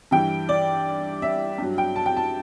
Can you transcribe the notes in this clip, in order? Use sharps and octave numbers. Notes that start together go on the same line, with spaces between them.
G2 E3 G3 G5
D5
E5
G2 F#3
G5
A5
G5
A5